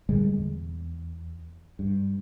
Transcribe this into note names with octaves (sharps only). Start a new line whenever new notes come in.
A#2 D3 G3 G#3
E2
G2